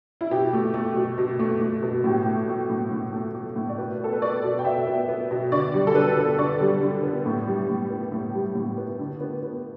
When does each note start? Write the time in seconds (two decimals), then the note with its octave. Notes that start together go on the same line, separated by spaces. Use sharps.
0.21 E4
0.31 B2 G4
0.53 A3
0.74 A3
0.96 B2
1.18 B2
1.39 A3
1.61 A3
1.83 B2
2.04 A2 G4
2.26 A3
2.48 A3
2.70 A2
2.91 A2
3.13 A3
3.35 A3
3.56 A2
3.69 D5
3.78 B2 B4
4.00 B3 A4
4.13 B4
4.22 B3 D5
4.44 B2
4.59 G5
4.65 B2 E5
4.87 B3
5.09 B3
5.31 B2
5.52 D3 D5
5.74 G3
5.87 A4
5.95 D3 B4
6.17 B3
6.38 D3 D5
6.60 G3
6.82 D3
7.03 B3
7.26 A2
7.47 G3
7.70 A2
7.90 B3
8.12 A2
8.34 G3
8.55 A2
8.78 B3
8.99 D3
9.21 B3
9.43 B3